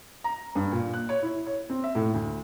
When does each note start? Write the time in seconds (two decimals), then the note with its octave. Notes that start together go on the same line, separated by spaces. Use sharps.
0.24 A#5
0.55 G2
0.72 A#2
0.93 F#6
1.09 C#5
1.23 E4
1.46 C#5
1.70 C4
1.84 E5
1.95 A2
2.14 D2